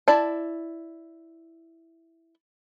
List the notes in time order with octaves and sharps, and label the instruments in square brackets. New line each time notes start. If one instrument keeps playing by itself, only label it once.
[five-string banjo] E4 D5 A5